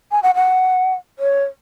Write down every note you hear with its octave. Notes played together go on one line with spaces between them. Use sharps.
G#5
F#5
F#5
C#5